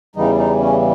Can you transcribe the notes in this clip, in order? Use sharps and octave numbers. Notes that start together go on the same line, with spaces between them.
E2 C#3 E3 G3 D#4
D#4
C#4